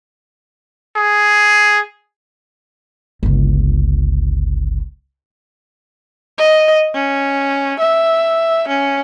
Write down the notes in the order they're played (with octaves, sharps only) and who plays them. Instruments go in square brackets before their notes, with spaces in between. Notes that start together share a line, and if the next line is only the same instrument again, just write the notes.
[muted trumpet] G#4
[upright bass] G1 C#2
[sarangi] D#5
C#4
E5
C#4